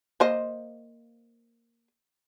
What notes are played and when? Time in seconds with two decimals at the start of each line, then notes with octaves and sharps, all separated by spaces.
0.20 A#3 C5 D#5